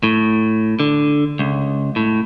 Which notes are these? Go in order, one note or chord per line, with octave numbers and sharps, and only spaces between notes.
A2
D3
C#2
A2